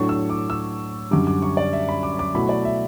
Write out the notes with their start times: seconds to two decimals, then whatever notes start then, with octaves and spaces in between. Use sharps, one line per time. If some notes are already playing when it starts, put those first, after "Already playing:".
Already playing: A2 F#3 A3 D4 C#6
0.09 E6
0.30 D6
0.50 E6
1.11 F#2 D3 G3 D6
1.27 D6
1.42 C#6
1.57 D5
1.73 E5
1.89 B5
2.03 D6
2.19 D6
2.34 B2 F#3 A3 E4 B5
2.49 D5
2.65 E5